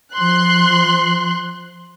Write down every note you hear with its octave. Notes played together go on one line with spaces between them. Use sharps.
F3 C6 F#6